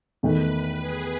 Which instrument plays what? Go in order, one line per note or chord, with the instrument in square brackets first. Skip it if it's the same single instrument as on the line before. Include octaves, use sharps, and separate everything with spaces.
[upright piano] E2 D#3 A3 [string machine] B4
[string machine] G#4